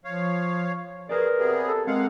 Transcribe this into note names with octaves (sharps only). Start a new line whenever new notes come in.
F3 C#5 F5
G#4 A#4 B4 D5
C3 B3 G#4
A4
G#3 A#3 C4 F5 F#5